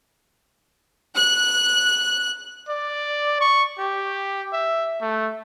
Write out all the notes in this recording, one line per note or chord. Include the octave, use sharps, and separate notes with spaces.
F#6
D5
C#6
G4
E5
A3